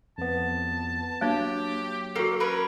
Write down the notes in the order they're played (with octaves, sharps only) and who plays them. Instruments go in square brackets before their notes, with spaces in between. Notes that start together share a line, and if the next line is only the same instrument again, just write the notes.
[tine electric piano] F2 B3 [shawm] A5
[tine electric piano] F#3 [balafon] A#3 D4 [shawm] G4
[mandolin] A#3 [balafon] F#4 A4
[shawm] C#4 [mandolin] A#4 B4